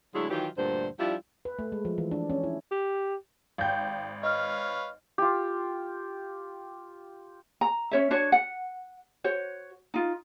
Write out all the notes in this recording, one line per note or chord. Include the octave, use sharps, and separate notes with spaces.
D3 F#3 G#3 A3 E4 G#4
D#3 E3 F#3 F4 G4
D2 G2 A#2 D3 C5
F3 G3 D4 E4 F4
B4
A3
G#3
F3
E3
D4
C#4
E4
G4
G#1 F5 G5 G6
B4 C#5 D#5 F5 F6
F4 G4
A#5
C#4 C#5 E5
D4 F#4 C#5
F#5
F#4 C5 C#5
D#4 F4